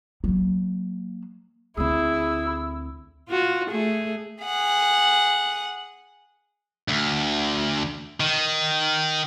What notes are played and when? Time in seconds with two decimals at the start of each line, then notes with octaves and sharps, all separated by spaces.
0.24 F#3 A#3
1.77 D2 C4 E4 G#4 E6
3.29 F4 F#4
3.70 A3 G#4
4.43 G#4 F#5
6.88 D2
8.20 D#3